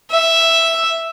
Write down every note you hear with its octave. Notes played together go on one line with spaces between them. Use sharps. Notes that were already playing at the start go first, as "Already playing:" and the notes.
E5